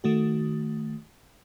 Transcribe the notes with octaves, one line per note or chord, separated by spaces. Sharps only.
D#3 A3 F#4